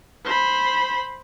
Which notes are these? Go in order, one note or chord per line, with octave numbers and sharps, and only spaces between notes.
C5 B5